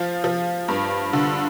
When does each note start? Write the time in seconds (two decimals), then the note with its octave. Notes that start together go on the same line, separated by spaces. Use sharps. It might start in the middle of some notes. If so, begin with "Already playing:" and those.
Already playing: F3 F4
0.24 F3
0.68 G2
1.13 D3